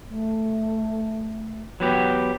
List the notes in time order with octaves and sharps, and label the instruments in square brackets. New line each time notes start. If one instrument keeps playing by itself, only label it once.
[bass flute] A3
[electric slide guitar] F#3 B3 G4